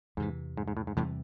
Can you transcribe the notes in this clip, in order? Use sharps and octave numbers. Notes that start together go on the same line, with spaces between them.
E2 G#2 C3 E3
G#2
G#2
A2
G#2
E2 A2 C3 E3 G3